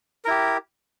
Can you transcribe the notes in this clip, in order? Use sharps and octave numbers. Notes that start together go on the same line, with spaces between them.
E4 G4 A#4